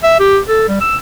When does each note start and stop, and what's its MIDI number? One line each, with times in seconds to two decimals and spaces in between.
0.04 0.18 76
0.20 0.39 67
0.48 0.64 69
0.69 0.78 55
0.81 0.97 88